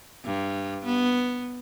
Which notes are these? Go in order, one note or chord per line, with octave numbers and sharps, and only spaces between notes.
G2
B3